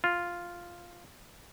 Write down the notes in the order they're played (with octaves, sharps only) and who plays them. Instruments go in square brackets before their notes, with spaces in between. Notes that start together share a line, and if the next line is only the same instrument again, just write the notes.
[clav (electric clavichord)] F4